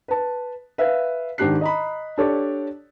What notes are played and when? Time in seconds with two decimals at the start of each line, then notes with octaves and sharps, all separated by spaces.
0.08 B4 A5
0.78 B4 E5 F5
1.38 G#2 D#3 D4 G4 F#6 C7
1.61 D#5 A#5 B5
2.18 D4 G4 A4 C#5 D5